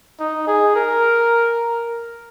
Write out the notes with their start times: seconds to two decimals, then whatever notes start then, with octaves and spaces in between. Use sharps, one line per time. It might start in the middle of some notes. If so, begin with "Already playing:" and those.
0.20 D#4
0.47 G#4
0.76 A#4